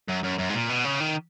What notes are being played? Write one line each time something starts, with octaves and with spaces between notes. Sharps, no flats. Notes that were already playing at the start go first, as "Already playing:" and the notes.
F#2
F#2
F#2
G#2
A#2
B2
C#3
D#3